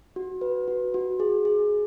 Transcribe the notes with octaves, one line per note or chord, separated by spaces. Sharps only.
F#4
B4
F#4
F#4
G#4
G#4